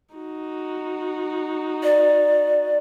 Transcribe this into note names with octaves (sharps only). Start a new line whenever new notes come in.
D#4 F#4
D5